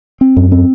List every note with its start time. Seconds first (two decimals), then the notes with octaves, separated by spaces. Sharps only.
0.21 C4
0.37 F#2
0.52 C4